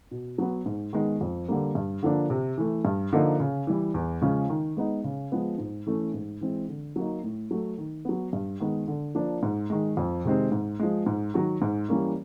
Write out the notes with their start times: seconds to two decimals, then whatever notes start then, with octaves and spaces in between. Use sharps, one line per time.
0.11 B2
0.38 F#3 B3
0.66 G#2
0.93 D#3 G#3 B3
1.21 F2
1.48 D3 G3 A#3
1.75 G2
2.03 D3 F3 A#3 D4
2.30 C3
2.58 E3 A3
2.85 G2
3.12 D3 F3 A#3 D#4
3.40 C#3
3.67 E3 G3
3.94 E2
4.21 C#3 F3 G#3 C#4
4.49 D#3
4.77 G#3 B3 D#4
5.04 C#3
5.32 F3 G#3 B3
5.58 G#2
5.87 E3 A3 C#4
6.14 G#2
6.41 E3 G#3 C4
6.69 D3
6.96 F#3 A#3 D#4
7.23 A2
7.51 F#3 A3
7.78 D#3
8.05 F#3 B3
8.33 G2
8.60 D#3 G#3 B3
8.88 D3
9.15 F3 A#3 D4
9.43 G#2
9.70 D#3 G#3
9.97 F2
10.25 C3 D#3 G#3 C4
10.52 G#2
10.79 F3 G#3
11.06 G#2
11.34 D#3 F#3
11.62 G#2
11.89 E3 G3 A#3 C#4